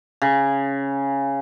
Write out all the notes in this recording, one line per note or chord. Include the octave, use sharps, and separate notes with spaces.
C#3